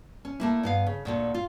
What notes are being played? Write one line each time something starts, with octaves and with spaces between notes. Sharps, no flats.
C#4
A3 A#3 E4
G2 B3 F5
C#3
D2 A#2 D3
F4